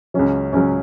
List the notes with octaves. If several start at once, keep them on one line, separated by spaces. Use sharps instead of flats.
C#2 C#3 F#3 C#4
C#2 C#3 F#3 C#4